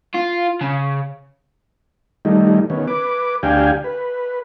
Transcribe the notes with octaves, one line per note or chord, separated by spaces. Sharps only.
F4
C#3
D#3 G3 A3 D#4
D#3 B3 C#4
B4 D6
D2 D4 G4 F5 G5 G#5
B4